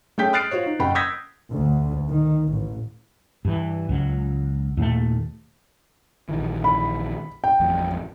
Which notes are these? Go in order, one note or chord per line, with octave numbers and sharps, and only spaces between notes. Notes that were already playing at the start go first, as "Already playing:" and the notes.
A3 C#4 G#4 G5 G6 B6
D#6 F6 F#6 A6 C7 D7
F4 F#4 C5 C#5
D#4
F#1 F#5 G5 B5
D#6 E6 G6 G#6 A#6 B6
D2
D#3
A1
G2 E3
C#2 F#3
D#2 A#2 A3
A#1 D#3 E3
B5
G5
A1 F2